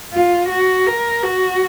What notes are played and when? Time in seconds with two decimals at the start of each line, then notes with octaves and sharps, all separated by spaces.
0.13 F4
0.49 F#4
0.86 A#4
1.23 F#4